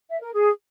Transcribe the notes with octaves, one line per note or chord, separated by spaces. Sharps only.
E5
A#4
G#4